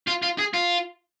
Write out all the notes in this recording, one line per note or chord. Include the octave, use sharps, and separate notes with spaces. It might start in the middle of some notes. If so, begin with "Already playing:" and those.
F4
F4
G#4
F4